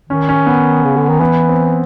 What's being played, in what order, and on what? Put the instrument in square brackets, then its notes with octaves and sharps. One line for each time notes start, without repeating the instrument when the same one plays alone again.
[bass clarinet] D#3 [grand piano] C#4
[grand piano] C#4
B3
[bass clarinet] C#3
D3
D#3
[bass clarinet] E3 [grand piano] B3
[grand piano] C4